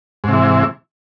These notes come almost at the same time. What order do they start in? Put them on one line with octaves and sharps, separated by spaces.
G#2 C3 E3